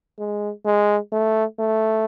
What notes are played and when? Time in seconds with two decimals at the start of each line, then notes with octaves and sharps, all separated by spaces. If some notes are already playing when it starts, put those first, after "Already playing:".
0.18 G#3
0.65 G#3
1.12 A3
1.59 A3